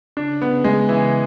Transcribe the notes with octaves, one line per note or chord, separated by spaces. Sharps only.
C#3 D4
B3
G#3
E3